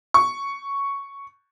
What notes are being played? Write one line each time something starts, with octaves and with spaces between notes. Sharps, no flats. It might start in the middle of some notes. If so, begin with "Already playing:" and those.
C#6